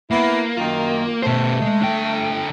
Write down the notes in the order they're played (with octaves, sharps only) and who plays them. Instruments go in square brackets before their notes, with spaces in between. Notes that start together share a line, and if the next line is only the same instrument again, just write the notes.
[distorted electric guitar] A#3 [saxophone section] B3 E4
[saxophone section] F#2 D#3 F4
[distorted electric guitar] B2 C5 [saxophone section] A3
[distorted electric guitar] G#3
D3 G5